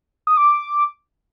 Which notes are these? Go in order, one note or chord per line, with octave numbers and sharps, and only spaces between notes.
D#6
D6